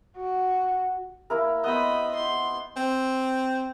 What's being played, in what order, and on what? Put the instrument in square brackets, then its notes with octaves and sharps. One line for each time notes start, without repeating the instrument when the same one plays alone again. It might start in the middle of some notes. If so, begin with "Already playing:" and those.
[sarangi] F#4
[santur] A#3 E4 A#4
[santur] B3 C5 [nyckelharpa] D#5 B5
[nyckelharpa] C6
[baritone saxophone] C4